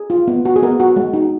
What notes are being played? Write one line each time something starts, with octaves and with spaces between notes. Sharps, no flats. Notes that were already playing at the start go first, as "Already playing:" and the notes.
Already playing: G#4
F4
B3
F#4
G#4
B3 A#4
F#4
G#3
D#4 F#4